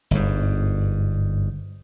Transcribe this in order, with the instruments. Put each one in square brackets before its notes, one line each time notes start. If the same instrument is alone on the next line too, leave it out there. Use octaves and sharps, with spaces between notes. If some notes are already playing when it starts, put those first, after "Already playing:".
[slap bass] G1 G#2